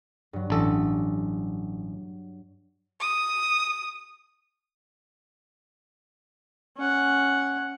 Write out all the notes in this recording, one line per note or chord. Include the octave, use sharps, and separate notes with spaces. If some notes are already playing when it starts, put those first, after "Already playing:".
G2 F#3
A1 A4
D#6
C#4 F#5